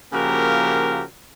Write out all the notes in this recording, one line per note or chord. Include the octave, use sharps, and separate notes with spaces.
C#3 F3 A#3 F#4 G4 A#4